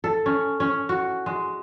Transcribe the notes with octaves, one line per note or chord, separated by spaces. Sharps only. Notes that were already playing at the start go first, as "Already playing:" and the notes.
A4
C#4
C#4
F#4
G#3